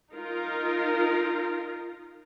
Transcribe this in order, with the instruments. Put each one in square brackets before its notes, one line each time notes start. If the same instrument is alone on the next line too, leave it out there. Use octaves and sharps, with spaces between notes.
[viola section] D#4 F4 A#4